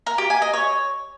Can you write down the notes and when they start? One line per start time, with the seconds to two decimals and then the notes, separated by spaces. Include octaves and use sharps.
0.06 A#4
0.18 G4
0.30 G#5
0.42 D#5
0.53 C#5